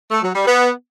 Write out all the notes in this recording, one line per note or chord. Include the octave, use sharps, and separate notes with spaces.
A3
F#3
G3
B3